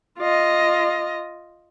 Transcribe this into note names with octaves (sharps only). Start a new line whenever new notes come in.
F4 D#5